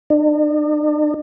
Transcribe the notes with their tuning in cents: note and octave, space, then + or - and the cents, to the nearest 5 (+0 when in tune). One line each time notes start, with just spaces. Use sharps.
D4 +45